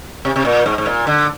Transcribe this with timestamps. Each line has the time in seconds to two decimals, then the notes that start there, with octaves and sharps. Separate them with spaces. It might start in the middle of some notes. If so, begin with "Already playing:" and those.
0.25 C3
0.36 C3
0.45 A#2
0.66 G#2
0.78 G#2
0.86 A#2
1.07 D3